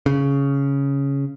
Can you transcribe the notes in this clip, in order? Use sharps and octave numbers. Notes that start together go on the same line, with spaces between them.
C#3